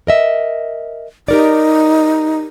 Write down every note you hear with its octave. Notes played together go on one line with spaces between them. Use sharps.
A#4 D#5 E5
D#4 G4 A#4 D5